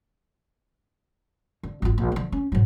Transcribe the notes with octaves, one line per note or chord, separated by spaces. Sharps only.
D3
G#1 F4
A#1
D3 F3
C#4
G#2 F#3